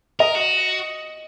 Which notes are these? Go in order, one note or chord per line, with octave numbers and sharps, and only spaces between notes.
A#4 D#5
F#4